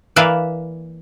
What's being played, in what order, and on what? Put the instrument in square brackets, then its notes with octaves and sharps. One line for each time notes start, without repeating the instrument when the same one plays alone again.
[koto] E3 A#3 B4 D5 E5 F5